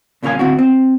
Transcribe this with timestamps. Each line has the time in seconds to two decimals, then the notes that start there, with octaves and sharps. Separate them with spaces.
0.23 C2 A#2 C#3 C#4 F5 G#5
0.39 D2 C4 E4 F#4
0.59 C4